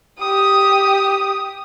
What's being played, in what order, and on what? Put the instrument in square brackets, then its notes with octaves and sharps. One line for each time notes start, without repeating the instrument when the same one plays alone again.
[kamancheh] G4 D#6